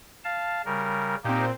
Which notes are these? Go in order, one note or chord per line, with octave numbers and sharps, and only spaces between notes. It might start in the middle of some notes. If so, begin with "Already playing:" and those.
F5 A5
C#3 G3 A#4
A#2 A#3 C4 D#4 G4